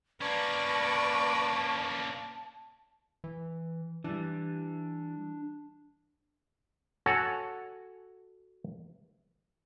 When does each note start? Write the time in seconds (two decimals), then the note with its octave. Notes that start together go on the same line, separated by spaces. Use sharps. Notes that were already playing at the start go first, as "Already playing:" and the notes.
0.21 A#3 C#4 B4 D5 A5 C#6
3.24 E3
4.04 E3 G3 D4
7.06 F#4 A4 C#5 F#5 G#5